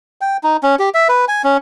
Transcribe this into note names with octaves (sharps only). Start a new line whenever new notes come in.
G5
D#4
C#4
G4
E5
B4
G#5
C#4